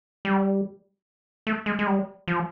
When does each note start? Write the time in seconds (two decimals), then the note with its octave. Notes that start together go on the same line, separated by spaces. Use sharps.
0.25 G3
1.47 A3
1.66 G#3
1.79 G#3
1.87 G3
2.28 F3